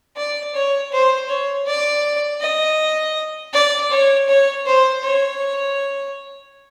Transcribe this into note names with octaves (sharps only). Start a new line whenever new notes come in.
D5
C#5
C5
C#5
D5
D#5
D5
C#5
C#5
C5
C#5